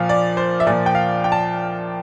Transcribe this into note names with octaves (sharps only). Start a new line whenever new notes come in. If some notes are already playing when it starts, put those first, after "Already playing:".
Already playing: A#2 F3 F5
D5
C5
E5
A#2 F3 D5
G5
F5
G5
A5